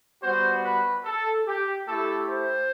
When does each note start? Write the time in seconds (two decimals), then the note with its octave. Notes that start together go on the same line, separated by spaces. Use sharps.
0.22 G3 B3 F#4 C5
0.64 B4
1.05 A4
1.47 G4
1.87 A3 E4 G4 A4
2.30 C5